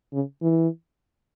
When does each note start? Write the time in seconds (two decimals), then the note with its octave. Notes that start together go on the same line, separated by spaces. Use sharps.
0.14 C#3
0.42 E3